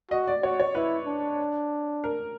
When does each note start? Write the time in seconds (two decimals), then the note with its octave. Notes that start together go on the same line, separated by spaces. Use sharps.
0.11 F#4 D#5
0.28 D5
0.43 F#4 C#5
0.60 C#5
0.75 E4 B4
1.07 D4
2.04 A#4